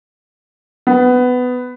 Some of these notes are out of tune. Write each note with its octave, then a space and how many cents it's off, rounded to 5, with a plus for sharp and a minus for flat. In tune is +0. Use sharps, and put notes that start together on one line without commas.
B3 +15